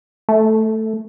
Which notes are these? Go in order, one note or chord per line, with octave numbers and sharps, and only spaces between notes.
A3